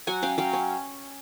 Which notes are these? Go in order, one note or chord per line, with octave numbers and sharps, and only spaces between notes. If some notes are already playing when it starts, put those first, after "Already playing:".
F#3 F#5 G#5
C#4 F5 G5
F#3 F5 G5
C#4